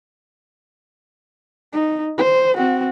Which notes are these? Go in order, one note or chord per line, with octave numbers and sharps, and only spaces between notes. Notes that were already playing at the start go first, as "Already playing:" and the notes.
D#4
C5
C4 F#4